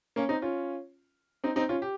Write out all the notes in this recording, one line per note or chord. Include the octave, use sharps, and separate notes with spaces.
A#3 C#4
C4 D#4
C#4 F4
C4 D#4
C4 D#4
C#4 F4
G4